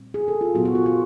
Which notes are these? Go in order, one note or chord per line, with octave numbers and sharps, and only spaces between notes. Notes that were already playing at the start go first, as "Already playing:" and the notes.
Already playing: A#2 G3 C4
G#4
A4
F4
A#2 F#3 B3 F#4
F#4
F4
F#4